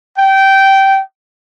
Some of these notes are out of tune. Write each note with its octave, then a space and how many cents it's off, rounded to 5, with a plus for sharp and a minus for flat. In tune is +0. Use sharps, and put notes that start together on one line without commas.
G5 -15